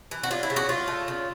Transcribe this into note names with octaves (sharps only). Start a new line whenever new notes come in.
E3
F#4
F#3 F4
E4
C#3
F#4
F#3 F4
A3
C#3